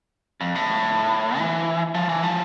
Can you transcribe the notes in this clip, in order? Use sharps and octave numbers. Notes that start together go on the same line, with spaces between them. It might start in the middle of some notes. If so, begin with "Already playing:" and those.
F2
A2
E3
F3
E3
F3